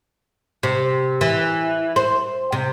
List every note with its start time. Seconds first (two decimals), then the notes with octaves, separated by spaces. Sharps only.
0.63 C3
1.21 E3
1.96 C5
2.52 C3